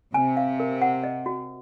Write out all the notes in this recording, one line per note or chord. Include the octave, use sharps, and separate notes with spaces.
C3 G#5
F5
A#4
F#5
D#5
F#4